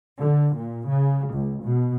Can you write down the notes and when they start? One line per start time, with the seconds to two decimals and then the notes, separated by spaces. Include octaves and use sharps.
0.18 D3
0.56 A#2
0.88 C#3
1.33 C#2
1.64 B2